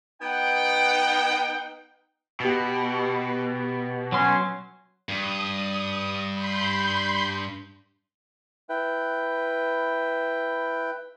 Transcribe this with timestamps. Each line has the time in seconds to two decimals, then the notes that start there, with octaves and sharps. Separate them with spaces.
0.22 B3 D#4 F#5 G5
2.40 B2 B3 G4
4.12 F#3 C#4 C6
5.09 G2 D#6
6.34 B5 C6 G6
8.69 E4 B4 G5